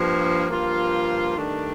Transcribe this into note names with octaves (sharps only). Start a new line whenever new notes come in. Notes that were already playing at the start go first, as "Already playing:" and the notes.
Already playing: G2 F3 A#3
G2 F3 A#3 F4
G2 D#3 A3 D4